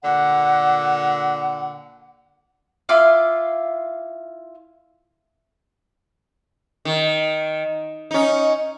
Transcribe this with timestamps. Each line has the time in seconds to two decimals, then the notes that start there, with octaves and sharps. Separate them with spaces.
0.03 A#2 D3 F#5
2.89 E4 F4 F5 D6
6.85 D#3
8.11 C#4 D#4